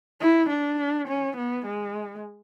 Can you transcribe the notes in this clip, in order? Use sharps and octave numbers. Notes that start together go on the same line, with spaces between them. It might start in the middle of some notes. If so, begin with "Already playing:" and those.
E4
D4
C#4
B3
G#3